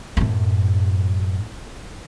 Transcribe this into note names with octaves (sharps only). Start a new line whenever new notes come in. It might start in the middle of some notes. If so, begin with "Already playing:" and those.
F#2 A2